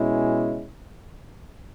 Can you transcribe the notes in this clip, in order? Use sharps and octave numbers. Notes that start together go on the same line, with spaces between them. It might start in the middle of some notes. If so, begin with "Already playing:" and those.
Already playing: B2 G#3 C#4 E4